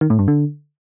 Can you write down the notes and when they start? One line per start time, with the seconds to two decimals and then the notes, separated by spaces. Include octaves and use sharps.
0.01 D#3
0.10 A2
0.19 G2
0.28 D3